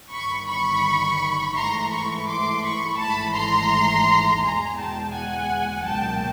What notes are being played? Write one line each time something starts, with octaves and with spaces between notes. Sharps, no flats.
G1 G2 D#3 B5 C#6
B5 C#6
G#2 E3 A3 A#5 C6
B5 C#6
C6 D6
B5 C#6
G#1 G#2 E3 A3 A5 B5
A#5 C6
E2 B2 G#3 G#5 A#5
G5 A5
F#5 G#5
C#2 B2 F#3 A#3 G5 A5